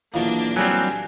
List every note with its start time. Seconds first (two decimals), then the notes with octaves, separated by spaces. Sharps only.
0.14 B1 E2 A#2 A#3 D4
0.56 F#3 G3 C4 G#5